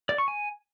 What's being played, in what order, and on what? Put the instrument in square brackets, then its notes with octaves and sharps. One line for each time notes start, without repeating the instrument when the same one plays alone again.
[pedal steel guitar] D5
C#6
G#5